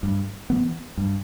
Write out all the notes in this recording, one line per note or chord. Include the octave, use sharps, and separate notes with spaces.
G2
E3 B3
G2